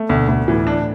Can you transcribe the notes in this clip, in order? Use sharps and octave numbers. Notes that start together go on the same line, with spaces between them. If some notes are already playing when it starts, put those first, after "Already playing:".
Already playing: A3
D2 B2
D2
A2 E3
D4